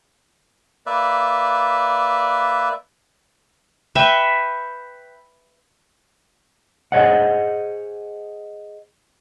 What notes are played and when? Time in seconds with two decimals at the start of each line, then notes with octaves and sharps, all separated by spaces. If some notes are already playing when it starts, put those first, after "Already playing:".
0.86 A#3 B4 D5 E5
3.95 B4 E5 G5 C#6
6.92 G#4 C5 C#5 D#5 F#5